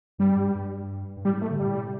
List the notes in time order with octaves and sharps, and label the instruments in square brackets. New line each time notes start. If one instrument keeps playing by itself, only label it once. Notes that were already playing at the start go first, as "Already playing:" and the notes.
[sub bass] G2 [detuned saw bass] G3
[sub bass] G2
G2
G2
[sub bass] A2 [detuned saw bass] G3
[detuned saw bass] A3
[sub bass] D3
[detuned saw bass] G3
[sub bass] A2
C3